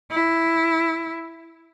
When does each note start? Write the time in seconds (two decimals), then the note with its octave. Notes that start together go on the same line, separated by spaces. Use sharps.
0.11 E4